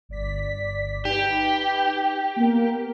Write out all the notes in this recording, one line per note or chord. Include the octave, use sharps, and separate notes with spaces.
G1 D5 B6
D#4 G4 B4
A#3 B3 A#4